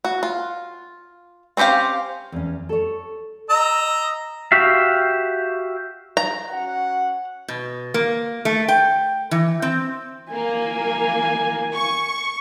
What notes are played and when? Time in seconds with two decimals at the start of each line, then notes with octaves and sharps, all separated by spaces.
0.05 F#4
0.23 F4
1.57 C4 C#4 G4 C5 F5
2.32 E2 C#4
2.69 A4 C#5
3.50 D#5 A#5 E6
4.52 F#4 G4 E5 F5
6.17 A#5
6.49 C#4 F#4 F#5
7.48 B2
7.94 A#3
8.45 A3
8.68 G5
9.31 E3
9.62 C4
10.32 A#3 G#5
11.74 C#6